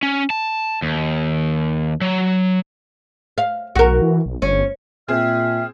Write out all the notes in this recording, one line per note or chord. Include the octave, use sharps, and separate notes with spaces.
C#4
A5
D#2
F#3
F5
B1 F#4 A#4
E3
B1
G1 C#4
A#2 C4 G#4 E5 G5 F6